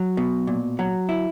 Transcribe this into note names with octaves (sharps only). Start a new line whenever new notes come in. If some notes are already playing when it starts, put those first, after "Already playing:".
Already playing: F#3
B2
A#2
F#3
E4